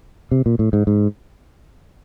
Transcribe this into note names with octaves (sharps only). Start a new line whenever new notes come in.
C3
A#2
A2
G#2
G#2